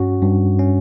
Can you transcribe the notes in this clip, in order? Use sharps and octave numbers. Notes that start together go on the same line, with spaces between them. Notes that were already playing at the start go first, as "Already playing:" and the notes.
Already playing: G2 C#4 F#4
G2
C#4